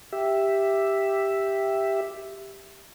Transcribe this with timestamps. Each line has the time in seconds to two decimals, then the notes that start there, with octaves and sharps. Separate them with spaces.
0.12 G4 E5